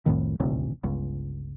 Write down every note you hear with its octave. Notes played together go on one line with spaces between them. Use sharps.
C2 F2 A2 D#3
D#1 A1 D2 C3
G1 C#2